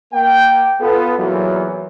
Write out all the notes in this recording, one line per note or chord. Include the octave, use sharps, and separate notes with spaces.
A#3 G5
B3 F4 A4
E2 A#2 E3 F#3